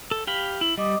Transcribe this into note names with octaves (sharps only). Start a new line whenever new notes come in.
A4
G4 F5 B5
E4
G3 D#5 D6 D#6